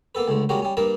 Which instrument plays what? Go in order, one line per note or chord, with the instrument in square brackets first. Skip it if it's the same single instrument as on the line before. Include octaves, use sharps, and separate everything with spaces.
[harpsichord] A#3 B3 A4 B4
C#2 D3 A3
D#2 G3 G#3 C#4 F#4 A#4
G3 C#4
G2 A#3 A#4 B4 A5